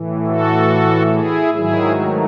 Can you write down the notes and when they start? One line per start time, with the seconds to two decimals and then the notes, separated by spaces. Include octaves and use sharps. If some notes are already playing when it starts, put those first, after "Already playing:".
Already playing: A2 E3
0.27 F#4 A4
1.12 E4 G#4
1.54 G#2 D#3 F#3 E4 G#4
1.97 A3